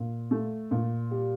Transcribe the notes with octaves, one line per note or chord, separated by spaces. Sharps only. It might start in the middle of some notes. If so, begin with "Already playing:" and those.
Already playing: A#2
A3
A#2
G3